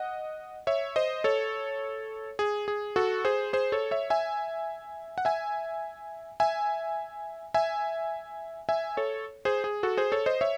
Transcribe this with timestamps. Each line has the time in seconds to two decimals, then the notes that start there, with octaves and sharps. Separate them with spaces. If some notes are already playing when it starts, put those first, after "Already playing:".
Already playing: D#5 F#5
0.67 C#5 E5
0.96 C5 D#5
1.24 A4 C#5
2.39 G#4
2.68 G#4
2.96 F#4 A4
3.25 G#4 C5
3.53 G#4 C5
3.72 A4 C#5
3.91 C#5 E5
4.10 E5 G#5
5.18 F#5
5.25 E5 G#5
6.40 E5 G#5
7.54 E5 G#5
8.69 E5 G#5
8.97 A4 C#5
9.45 G#4 C5
9.64 G#4
9.83 F#4 A4
9.97 G#4 C5
10.12 A4 C#5
10.26 C5 D#5
10.41 C#5 E5